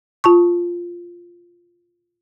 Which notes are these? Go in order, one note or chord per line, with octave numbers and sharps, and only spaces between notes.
F4 A5 C#6